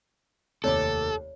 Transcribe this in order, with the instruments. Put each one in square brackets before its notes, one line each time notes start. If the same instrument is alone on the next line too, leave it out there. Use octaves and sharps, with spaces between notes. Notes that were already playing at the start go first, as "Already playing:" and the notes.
[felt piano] F1 D#2 D6 [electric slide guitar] A4 [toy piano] C#5 D5